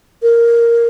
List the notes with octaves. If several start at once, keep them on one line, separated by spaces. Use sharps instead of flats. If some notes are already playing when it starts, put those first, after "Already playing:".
A#4